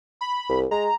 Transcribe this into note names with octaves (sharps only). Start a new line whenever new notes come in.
B5
C2
G#3 A#5